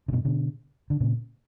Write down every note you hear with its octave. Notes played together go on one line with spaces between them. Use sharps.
C#3
G2 B2
B2 D3
D3
A#2 C#3